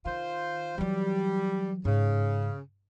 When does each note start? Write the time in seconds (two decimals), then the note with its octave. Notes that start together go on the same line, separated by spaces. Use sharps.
0.05 D#3 F4 C5
0.78 E3 F#3 G3
1.85 G#2 C#3